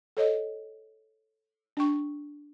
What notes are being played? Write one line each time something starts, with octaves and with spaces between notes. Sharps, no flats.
A4 C#5 D#5
D4 G5 C#6